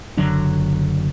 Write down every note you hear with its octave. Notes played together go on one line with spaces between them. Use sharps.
F#1 D3 F#3 D4